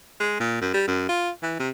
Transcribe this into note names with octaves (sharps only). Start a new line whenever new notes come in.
G#3
A#2
F#2
G3
F#2
F4
E3
C3